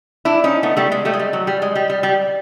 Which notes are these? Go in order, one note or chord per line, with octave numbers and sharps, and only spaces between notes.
D4 E4
C#4 D#4
A3 B3
G3 A3
G#3
G3 A3
G#3
G3
F#3
G3
G#3
G3
G3
G3